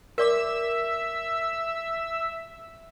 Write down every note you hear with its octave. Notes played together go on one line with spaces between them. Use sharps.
A#4 D5 E5 D6 E6